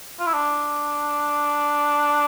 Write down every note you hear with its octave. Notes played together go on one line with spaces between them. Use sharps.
F4
E4
D4